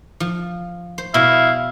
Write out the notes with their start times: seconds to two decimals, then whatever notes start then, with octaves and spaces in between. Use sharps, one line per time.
0.20 F3
0.98 C5
1.14 B2 E4 F5